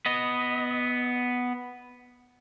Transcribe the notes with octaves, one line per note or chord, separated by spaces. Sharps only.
B3 D#5